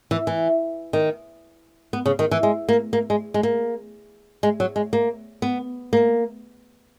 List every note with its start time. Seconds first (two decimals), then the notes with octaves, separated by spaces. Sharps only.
0.11 E3
0.27 E3
0.93 D#3
1.93 B3
2.06 C#3
2.19 D#3
2.31 E3
2.43 G#3
2.69 A#3
2.93 A#3
3.10 G#3
3.34 G#3
3.43 A#3
4.43 G#3
4.60 F#3
4.76 G#3
4.93 A#3
5.42 B3
5.93 A#3